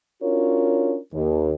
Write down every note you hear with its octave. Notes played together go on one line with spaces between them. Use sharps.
C#4 D4 F4 F#4 A#4 C#5
D#2